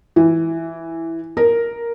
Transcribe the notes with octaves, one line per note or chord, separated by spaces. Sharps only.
E3
A#4